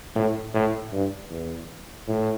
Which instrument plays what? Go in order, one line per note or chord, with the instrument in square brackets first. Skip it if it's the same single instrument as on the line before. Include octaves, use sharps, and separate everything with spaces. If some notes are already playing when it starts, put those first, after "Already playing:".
[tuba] A2
A2
G2
E2
A2